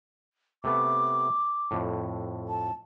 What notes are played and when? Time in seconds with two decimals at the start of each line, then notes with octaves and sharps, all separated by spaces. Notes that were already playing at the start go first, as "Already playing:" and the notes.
0.64 C3 A3 B3 D6
1.71 F2 A2
2.48 A5